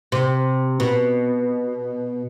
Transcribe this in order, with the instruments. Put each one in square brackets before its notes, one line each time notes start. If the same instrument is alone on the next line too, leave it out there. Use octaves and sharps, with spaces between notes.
[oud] C3
B2